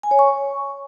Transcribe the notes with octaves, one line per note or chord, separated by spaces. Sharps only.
G#5
C#5
C#6